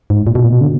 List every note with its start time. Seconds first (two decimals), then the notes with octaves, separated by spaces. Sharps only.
0.10 G#2
0.27 A#2
0.35 B2
0.44 A#2
0.52 B2
0.61 D3